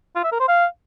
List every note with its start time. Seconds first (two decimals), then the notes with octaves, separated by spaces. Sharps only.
0.15 F4
0.24 E5
0.32 A#4
0.40 C5
0.48 F5